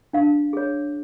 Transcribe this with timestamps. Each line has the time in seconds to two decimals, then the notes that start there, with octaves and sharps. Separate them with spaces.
0.13 D4 F5
0.53 G#4 C#5